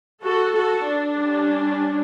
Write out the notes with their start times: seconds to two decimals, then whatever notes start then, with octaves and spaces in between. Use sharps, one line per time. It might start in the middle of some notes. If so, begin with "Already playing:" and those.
0.22 F#4 A4
0.53 F#4 A4
0.85 D4
1.15 G3 C#4